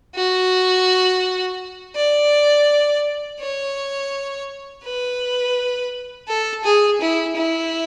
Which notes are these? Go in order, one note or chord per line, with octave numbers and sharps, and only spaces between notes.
F#4
D5
C#5
B4
A4
G#4
E4
E4